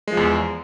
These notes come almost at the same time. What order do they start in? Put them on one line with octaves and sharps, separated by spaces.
G#3 F3 E2